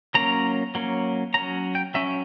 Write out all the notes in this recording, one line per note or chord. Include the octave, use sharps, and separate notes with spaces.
F#3 A#3 C#4 A#5
F#3 A#3 C#4
F#3 C#4 A#5
G5
F#3 C#4 E5